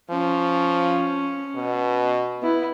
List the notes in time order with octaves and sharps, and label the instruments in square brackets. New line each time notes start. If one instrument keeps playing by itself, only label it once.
[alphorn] F3 [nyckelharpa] C#4
[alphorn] B2
[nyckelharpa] B3 E4